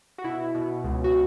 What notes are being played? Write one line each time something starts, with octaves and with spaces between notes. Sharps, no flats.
F#4
B2 E4
B2
C#2
F#4